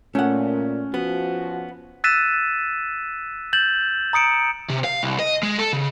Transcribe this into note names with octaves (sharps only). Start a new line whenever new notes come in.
A#2 A3 C#4 F#5
F3 B3 F#4
E6 F#6 A6 B6 D#7 E7
G6 A6 E7 F#7
A#5 D#6 C#7 D7
C3
F5
C2
D#5
G#3
A4
C#3